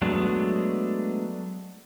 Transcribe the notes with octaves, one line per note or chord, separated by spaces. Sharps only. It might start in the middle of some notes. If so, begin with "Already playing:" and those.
F#3 G#3 A3 B3 D4